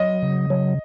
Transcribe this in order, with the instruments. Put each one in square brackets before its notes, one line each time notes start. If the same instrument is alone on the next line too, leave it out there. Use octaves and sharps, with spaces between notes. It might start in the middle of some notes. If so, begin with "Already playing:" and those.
Already playing: [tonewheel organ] F#3 [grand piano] D#5
[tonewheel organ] C#3
F#3